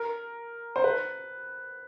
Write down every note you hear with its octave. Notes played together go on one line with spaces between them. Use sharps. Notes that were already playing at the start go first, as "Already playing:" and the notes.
Already playing: A#4
C5
B4